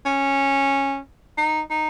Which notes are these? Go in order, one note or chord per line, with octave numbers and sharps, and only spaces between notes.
C#4
D#4
D#4